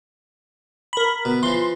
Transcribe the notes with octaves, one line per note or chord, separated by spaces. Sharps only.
A#4 B5
B2
E3 F3 C6